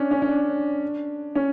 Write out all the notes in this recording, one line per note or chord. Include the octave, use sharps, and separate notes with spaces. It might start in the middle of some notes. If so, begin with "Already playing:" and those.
Already playing: C#4 D4
C#4
C#4
D4
C#4